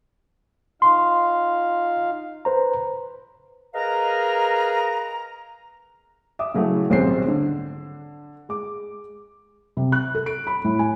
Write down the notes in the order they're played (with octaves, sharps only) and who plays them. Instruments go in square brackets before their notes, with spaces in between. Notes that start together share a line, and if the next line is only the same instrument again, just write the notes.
[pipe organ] D#4 F4 F5 [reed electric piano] C6
[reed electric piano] B4 C5 A#5
[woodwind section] G#4 A#4 B4 D#5 F5 A#5
[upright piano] E5 D6 D#6
C#3 F#3 A3 E4
D#1 B1 G#2 C4 C#4 C7
D3
G#3 D6
[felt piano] C3
F#6
A4
D7
B5
A2
G#5